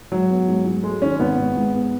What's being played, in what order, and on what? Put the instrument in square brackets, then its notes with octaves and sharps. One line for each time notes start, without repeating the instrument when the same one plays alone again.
[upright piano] G#2 [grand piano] F#3
[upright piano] B3
G#2
F#3
[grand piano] G#3 [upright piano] A3
[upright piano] D#3 [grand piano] C#4
[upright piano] G#1 [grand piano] B3
[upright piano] G#2
G#2
B3